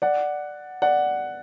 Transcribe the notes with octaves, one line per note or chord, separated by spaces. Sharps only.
D5 F#5
D5 F#5